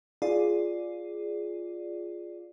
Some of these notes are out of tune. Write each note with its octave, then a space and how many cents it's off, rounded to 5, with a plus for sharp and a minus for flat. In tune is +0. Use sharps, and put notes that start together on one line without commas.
F4 +0 G#4 +0 D5 +0